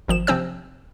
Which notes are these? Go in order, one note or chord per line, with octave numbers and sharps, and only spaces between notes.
G#1 F3 E7
C3 F3 C4 C5 E6